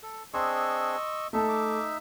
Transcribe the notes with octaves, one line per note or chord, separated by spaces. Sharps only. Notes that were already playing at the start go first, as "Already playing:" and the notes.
A4
C4 D4 G#4 D#5 C6 C#6 E6
A3 D#4 A4 E5 A5
D6